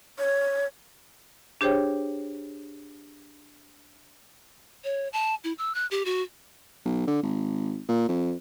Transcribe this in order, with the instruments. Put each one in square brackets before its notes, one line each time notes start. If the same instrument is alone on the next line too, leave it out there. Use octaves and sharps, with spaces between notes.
[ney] C#5
[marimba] D4 G4 G#4 C5 C#5 G5
[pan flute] C#5
A5
E4
E6
F#6
G4
F#4
[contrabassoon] B1
D3
G#1
A#2
F2